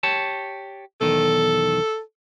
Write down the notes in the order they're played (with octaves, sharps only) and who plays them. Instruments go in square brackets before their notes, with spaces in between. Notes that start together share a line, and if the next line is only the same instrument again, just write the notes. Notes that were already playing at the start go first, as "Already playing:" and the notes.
[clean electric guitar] G4 C#5 A5
[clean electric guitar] B1 E2 D#3 [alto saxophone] A4